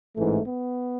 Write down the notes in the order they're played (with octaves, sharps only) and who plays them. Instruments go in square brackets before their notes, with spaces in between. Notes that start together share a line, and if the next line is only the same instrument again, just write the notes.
[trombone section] A1 G#2 E3 A3
B3